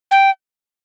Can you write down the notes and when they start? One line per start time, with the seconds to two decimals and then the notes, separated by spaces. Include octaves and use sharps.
0.11 G5